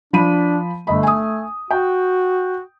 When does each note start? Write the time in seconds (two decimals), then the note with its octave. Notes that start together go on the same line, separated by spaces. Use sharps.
0.13 F3 D4 B5 D#7
0.87 G1 A3 D#5 B5
1.03 G#5 D#6
1.71 F#4 G5